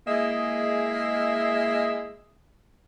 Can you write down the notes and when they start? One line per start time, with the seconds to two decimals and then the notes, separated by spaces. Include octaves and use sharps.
0.07 G#3 A#3 E4 G#4 D#5 E5